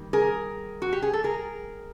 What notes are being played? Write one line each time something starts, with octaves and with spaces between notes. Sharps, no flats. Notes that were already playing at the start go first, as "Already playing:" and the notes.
Already playing: D#3 G3 A#3
G#4 A#4
F#4
G4
G#4
A4
G#4 A#4